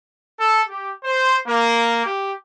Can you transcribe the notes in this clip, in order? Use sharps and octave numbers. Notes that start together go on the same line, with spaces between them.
A4
G4
C5
A#3
G4